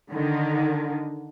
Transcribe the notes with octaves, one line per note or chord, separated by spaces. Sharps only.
D3 D#3